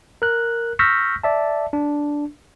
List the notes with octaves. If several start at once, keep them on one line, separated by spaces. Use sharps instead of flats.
A#4 F#6
C#6 E6 F6 G6 A#6 B6
D5 E5 A5
D4